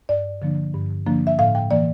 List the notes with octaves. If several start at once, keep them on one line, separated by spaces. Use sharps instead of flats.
G2 D5
D3 F3 A#3 D4
G2
D3 F3 A#3 D4
E5
A2 F5
G5
E3 A#3 D5